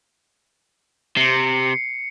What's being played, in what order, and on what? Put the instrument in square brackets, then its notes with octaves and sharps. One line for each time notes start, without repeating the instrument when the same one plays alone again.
[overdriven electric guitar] C3 [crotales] C7 C#7